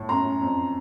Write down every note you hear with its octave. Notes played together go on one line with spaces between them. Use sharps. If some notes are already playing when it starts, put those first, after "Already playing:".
Already playing: A2
F#2 A#5 C6
F#2
F2